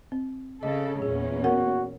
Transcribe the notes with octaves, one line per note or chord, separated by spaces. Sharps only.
C4
C#3 A4 D#5
E2 A#2 C#4 G#4
B3 F#4 A#4 F#5